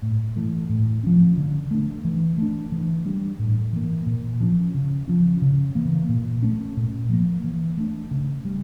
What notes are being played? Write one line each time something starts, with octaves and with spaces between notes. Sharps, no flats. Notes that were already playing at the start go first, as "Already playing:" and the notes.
A2
E3 A3
A2
F3 C#4
D3
A3 D4
E3
A3 D4
E3
G3 D4
A2
E3 A#3
A#2
F3 C#4
C#3
F3 C#4
C#3
E3 A#3
A#2
A3 C#4
A#2
F3 A#3
E3
A3 D4
C#3
G3